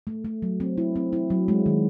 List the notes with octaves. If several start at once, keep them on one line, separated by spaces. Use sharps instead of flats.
A3
A3
F#3
C4
E4
C4
E4
F#3
G#3
D#3